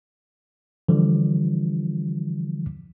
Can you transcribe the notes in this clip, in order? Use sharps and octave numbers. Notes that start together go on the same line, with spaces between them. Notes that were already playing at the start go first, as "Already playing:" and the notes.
D3 E3 F3 G3